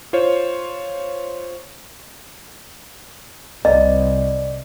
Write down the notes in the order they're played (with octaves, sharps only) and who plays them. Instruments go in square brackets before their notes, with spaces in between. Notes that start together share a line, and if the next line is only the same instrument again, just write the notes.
[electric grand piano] F4 C5 C#5
[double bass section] C2 [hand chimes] D5 [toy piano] D#5